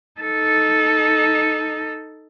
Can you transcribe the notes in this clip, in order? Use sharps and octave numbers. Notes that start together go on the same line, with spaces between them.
D#4 A4